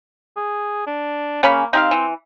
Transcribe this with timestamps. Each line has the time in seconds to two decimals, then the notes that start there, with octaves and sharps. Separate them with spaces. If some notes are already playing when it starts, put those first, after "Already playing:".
0.37 G#4
0.87 D4
1.43 C#3 A#3 C#4 B5
1.73 C4 D#4 G4 F5
1.91 E3